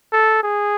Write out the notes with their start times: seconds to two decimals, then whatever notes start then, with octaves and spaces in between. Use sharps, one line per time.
0.12 A4
0.43 G#4